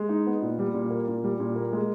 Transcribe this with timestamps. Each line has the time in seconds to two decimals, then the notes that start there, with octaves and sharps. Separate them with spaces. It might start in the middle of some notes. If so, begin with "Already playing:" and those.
Already playing: G#3
0.09 D#4
0.26 B3
0.42 A#2
0.59 G3
0.74 A#2
0.90 A#3
1.08 A#2
1.24 G3
1.40 A#2
1.56 A#3
1.73 G#3